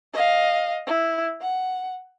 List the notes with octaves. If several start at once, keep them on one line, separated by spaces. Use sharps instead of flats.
D#5 F5
E4
F#5